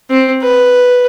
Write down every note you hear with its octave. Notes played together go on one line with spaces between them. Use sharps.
C4
B4